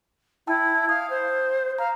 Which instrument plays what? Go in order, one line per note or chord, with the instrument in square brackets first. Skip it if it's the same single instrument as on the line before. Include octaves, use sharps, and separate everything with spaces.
[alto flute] E4 [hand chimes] G5 A5 E6
[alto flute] F5 [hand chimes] D#6
[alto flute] C5
[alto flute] F5 [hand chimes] A#5